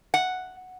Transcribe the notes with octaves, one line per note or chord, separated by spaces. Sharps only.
F#5